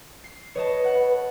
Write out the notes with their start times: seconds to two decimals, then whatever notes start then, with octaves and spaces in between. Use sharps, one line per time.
0.24 C7
0.55 B4 C#5 D#5 A5
0.84 F#5